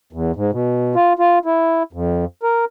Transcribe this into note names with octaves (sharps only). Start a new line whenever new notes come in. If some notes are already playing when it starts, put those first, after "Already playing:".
E2
G#2
B2
F4
F4
E4
F2
A#4